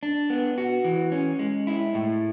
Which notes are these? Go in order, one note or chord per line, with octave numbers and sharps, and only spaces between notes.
D4
B3
F#4
E3
C#4
G#3
E4
A2